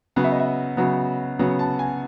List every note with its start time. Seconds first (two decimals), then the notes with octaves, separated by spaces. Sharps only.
0.16 C#3 F#3 B3 F#5
0.24 E5
0.32 D#5
0.39 E5
0.77 C#3 F#3 B3
1.39 C#3 F#3 B3 F#5
1.59 A5
1.79 G#5